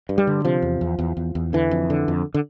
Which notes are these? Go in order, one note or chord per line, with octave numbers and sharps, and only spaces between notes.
G2
G3
D3
C3 F3
E2
E2
E2
E2
E2
D3 E3
F2
D3
F2
D3